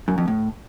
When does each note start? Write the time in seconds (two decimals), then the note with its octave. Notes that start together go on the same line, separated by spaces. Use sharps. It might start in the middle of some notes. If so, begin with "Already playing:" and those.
0.08 F#2
0.18 F2
0.28 A2